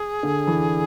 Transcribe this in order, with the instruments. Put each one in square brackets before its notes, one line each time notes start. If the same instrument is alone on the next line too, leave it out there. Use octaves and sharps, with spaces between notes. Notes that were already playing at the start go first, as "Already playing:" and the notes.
Already playing: [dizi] G#4
[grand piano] D3
E3